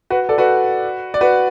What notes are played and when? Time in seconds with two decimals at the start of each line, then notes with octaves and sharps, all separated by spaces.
0.10 F#4 B4
0.29 A4 D5
0.38 F#4 B4
1.14 D5
1.21 F#4 B4